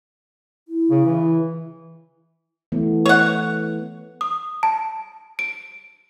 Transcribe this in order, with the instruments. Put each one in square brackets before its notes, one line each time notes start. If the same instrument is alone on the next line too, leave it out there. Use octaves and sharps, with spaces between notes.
[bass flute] E4
[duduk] C#3
E3
[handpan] E3 A3 B3
[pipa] C#5 F#5
[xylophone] D#6
A5
D7